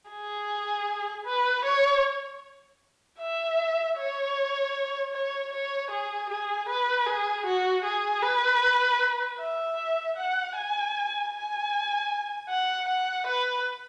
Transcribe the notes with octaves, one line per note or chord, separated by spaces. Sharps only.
G#4
B4
C#5
E5
C#5
C#5
C#5
G#4
G#4
B4
G#4
F#4
G#4
B4
E5
F#5
G#5
G#5
F#5
F#5
B4